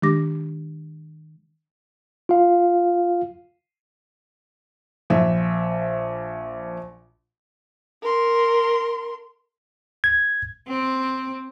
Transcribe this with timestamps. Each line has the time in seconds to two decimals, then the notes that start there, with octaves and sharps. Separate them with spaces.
0.02 D#3 G#3 D4 G4 D6 A#6
2.29 F4 F5
5.10 A#1 F3 E5
8.02 A#4 C6
10.04 G#6
10.68 C4